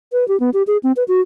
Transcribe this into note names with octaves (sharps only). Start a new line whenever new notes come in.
B4
G4
B3
G4
G#4
C4
B4
F#4